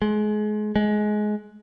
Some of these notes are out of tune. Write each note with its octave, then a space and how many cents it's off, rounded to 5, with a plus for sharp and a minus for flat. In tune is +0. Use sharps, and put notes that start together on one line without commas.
G#3 +30
G#3 +20